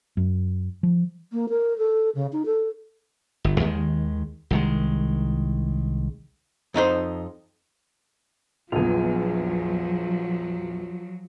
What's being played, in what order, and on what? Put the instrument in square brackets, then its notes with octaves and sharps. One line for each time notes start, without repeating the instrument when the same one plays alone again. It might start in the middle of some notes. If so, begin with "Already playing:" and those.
[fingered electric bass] F#2
F3
[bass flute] A#3
A#4
A4
C#3
D#4
A4
[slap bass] G1
D#2 D#3 E3 G#3
C2 D#3 G#3
[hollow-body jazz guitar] F2 D#4 F4 C5
[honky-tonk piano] A#1 E2 [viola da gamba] F3 [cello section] F#3 [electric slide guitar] F4 G#4